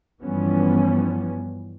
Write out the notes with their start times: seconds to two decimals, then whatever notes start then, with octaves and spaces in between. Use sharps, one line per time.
0.22 G2 E3 F3 G3 B3 C#4